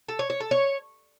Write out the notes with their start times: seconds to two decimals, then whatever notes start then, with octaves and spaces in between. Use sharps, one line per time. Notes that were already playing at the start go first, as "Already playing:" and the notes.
0.08 A4
0.19 C#5
0.30 C#5
0.40 A4
0.51 C#5